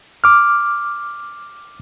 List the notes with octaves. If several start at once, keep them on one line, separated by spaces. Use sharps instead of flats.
D6 F6